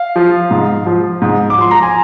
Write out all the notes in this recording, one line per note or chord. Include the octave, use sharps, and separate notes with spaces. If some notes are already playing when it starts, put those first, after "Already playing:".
Already playing: F5
F3
G#2
F3
G#2
D6
F3 C6
A#5
G#5